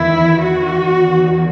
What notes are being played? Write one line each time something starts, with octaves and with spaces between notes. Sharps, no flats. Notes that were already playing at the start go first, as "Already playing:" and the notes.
Already playing: E2 D#3 E4
F#4
E2 D#3